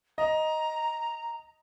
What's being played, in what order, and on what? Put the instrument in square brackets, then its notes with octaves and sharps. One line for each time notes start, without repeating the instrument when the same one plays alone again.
[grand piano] D#5 [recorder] A#5